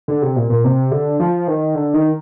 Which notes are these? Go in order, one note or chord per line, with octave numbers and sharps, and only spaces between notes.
D3
C3
A#2
A#2
C3
D3
F3
D#3
D3
D#3